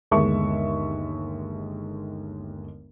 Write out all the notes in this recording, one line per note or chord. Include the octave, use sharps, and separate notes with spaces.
G1 D#2 G#3 E5 C#6